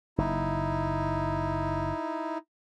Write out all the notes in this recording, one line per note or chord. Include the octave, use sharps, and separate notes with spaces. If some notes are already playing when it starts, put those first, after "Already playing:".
F#1 D#4 E4